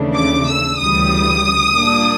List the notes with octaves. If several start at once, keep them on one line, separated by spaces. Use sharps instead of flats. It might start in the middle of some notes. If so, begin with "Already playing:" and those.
Already playing: D#2 C#3 E3 A3 D4
D6
E6
D2 C#3 E3 G3 D#6
A#2 G3 A#3 D4